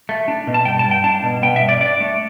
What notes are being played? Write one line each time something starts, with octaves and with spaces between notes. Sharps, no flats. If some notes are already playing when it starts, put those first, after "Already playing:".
A3
D4
B2
A5
G2 G5
A5
G2
G5
D4 A5
B2
B3 G5
E5
G2
D5
D4 D5
A3